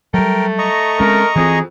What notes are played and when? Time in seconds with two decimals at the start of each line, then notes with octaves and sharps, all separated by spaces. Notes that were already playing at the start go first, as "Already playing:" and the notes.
0.14 F#3 G3 A3 A#4 G5
0.59 D#5 A#5 C#6
1.00 G#3 C4 C#4 A#4
1.36 F2 E3 C4 G#4